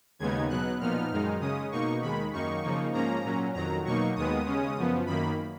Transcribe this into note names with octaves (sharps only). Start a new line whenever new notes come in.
D#2 C#3 G#3 B3 D#4 G#6
B2 F#3 B3 F#6
A#2 F3 B3 D#4 F6
F#2 D#3 G#3 D#4
C#3 G#3 C#4 D#6
B2 A#3 D#4 C#6
D#2 D#3 G#3 B5
F#2 D#3 A#3 D#4 C#6
C#3 F3 A#3 D#4
G#2 F3 A#3 C#4 A#5
A#2 F#3 C#4
F2 D#3 F#3 A#5
B2 F#3 A#3 D#4 C#6
D#2 D#3 G#3 B3 D#6
C#3 G#3 C#4
F#2 F3 B3
F#2 D#3 A#3 B5